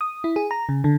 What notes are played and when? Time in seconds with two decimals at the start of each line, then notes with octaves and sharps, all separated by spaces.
0.01 D#6
0.24 E4
0.36 G#4
0.51 A#5
0.69 C#3
0.84 D3